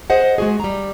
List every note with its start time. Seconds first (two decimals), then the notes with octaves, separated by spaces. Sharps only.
0.10 G#4 C5 D#5 F#5
0.38 G#3 F#4 G#4
0.60 G3 A#5